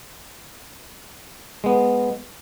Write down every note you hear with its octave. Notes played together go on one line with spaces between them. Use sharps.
G#3 B3